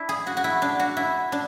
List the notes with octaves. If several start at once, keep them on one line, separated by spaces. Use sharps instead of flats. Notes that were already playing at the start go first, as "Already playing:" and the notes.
Already playing: D4 E4
G#4
F#4
F#4
E4
D4
F#4
E4
D4